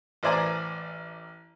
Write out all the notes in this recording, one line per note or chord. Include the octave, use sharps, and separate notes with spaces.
A1 B4 C5 D5 G#5 A#5